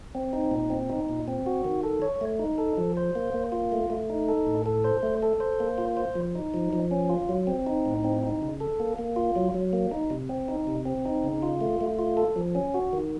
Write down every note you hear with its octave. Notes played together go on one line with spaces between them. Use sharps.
C4
D#4
A#2
C4
D#4
A#2
C4
F#4
D#3
A4
C#5
A3
D#4
A4
F3
C5
A#3
A#3
F4
A3
A3
D#4
A4
A2
A4
C5
A3
A4
C5
A#3
F4
C5
F3
D#4
F3
F3
C#4
F4
F#3
C4
D#4
A2
C4
D#4
C#3
A4
A#3
A#3
F4
F#3
F#3
A#3
D#4
C3
C4
D#4
C3
C4
D#4
C#3
F4
A3
A3
F4
A4
F3
C#4
F#4
D#3